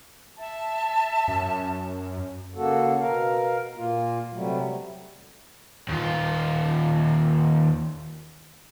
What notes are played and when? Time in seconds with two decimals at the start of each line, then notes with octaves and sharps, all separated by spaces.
0.38 E5 A5
1.28 F#2
2.55 C#3 A#3 F#4 A4
3.00 B2 A#4 F5
3.76 A#2 A#3 F4
4.32 C3 F#3 G3 A3
5.88 D#2 F4